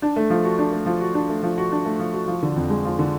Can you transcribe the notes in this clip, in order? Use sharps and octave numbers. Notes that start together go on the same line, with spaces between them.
D4
A3
F3
F#4
D4
A3
F3
F#4
D4
A3
F3
F#4
D4
A3
F3
F#4
F3
D3
F2
G#3
F3
D3